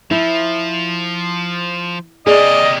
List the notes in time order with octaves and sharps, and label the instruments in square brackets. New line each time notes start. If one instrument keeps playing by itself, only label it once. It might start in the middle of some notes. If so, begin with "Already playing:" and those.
[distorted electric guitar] F3 [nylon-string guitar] E4
[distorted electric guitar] C3 A#3 [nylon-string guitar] G#4 [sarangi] D5 [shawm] D#5